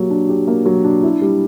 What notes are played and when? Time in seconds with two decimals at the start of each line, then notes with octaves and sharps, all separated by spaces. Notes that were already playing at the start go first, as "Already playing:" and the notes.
Already playing: F#3 A#3 G4
0.10 D4
0.29 G4
0.47 A#3
0.66 F#3
0.84 D4
1.03 E4
1.22 G3